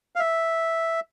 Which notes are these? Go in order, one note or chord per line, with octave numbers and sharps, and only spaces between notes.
F5
E5